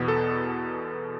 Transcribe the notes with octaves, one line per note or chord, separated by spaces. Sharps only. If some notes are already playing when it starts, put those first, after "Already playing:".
Already playing: E2 B2 B3
A4